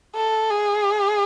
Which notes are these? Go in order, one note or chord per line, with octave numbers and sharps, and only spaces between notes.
A4
G#4